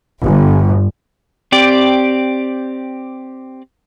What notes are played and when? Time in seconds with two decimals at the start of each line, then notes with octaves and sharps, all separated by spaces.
0.22 G1
1.52 C4 G4 D5